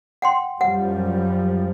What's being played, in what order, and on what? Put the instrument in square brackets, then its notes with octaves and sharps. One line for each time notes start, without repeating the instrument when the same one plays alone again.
[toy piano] F#5 G5 C6
[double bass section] F#2 F3 G3 [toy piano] F#5